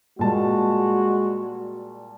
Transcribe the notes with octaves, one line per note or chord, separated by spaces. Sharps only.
A#2 G3 G#3 F#4 A5